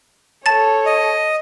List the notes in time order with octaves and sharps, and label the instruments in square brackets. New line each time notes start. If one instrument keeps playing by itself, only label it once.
[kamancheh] A4 C#5 [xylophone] A5 A6
[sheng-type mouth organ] D#5